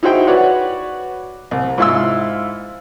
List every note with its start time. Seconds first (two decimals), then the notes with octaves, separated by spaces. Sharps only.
0.03 D#4 E4 F#4 G#4 C5 G5
0.27 F#4 B4 C#5 D5 F#5
1.51 C2
1.78 G#2 E4 F4 F5 C6 E6